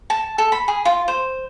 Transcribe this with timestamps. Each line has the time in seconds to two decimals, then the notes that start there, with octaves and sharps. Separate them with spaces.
0.10 A5
0.38 A4
0.52 B5
0.68 G#4
0.85 F4
1.08 C5